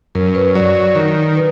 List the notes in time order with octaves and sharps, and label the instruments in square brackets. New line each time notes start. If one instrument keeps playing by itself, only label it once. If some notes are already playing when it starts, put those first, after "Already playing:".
[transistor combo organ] F#2 [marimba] A#4
[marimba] B4
[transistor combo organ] F#3 [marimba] D5
[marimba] D5
[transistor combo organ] D#3 [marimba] A#4
[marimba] B4